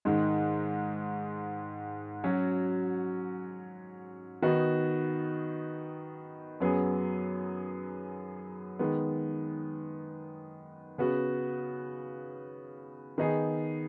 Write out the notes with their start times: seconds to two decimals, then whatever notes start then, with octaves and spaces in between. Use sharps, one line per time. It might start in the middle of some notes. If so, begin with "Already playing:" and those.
0.05 G#2 D#3 G#3 D#4
2.24 F#3 C#4 F#4
4.42 D#3 B3 D#4 F#4
6.60 F#2 F#3 B3 G#4
8.79 D#3 G#3 B3
10.98 C#3 B3 F#4
13.18 D#3 B3 D#4 G#4